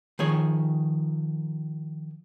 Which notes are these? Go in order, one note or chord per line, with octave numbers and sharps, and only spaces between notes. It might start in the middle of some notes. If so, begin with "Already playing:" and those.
D#3 F3 G#4 C#5